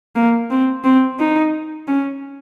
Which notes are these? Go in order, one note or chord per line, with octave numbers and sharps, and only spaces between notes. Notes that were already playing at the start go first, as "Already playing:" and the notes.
A#3
C4
C4
D#4
C#4